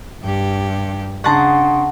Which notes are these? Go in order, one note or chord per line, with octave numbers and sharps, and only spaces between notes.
G2 G4
C#3 D4 F#5 A5 A#5 C6 C#6